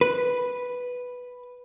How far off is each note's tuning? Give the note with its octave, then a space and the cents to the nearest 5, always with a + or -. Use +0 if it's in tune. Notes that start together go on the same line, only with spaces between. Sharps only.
B4 +0